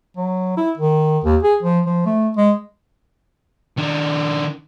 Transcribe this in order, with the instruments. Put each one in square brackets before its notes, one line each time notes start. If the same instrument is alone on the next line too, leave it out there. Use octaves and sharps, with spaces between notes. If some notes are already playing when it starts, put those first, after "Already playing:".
[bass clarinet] F#3
E4
D#3
D#2
G#4
F3
F3
A3
G#3
[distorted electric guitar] D#3 D4